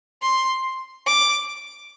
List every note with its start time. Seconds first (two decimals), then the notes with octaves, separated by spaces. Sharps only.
0.22 C6
1.06 D6